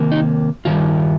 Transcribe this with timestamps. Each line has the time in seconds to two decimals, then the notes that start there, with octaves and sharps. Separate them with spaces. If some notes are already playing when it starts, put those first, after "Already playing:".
Already playing: C3 D#3 A#3
0.12 D#4
0.65 G2 D#3 G3 F4